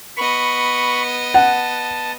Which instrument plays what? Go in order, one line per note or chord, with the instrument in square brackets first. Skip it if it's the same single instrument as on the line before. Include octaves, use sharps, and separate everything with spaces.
[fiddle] B3 D#5 [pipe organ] B5 C#6
[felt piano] F#5 [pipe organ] A5